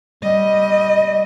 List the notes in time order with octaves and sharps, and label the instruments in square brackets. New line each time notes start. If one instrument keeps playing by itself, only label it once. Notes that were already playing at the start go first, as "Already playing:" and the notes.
[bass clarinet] G3 [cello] D#5